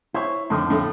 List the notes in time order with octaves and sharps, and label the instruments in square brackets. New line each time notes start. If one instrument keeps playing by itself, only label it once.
[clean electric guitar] E4 C#5 [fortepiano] C5
[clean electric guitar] F2 D3 D#3 [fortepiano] A2
[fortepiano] A2 A3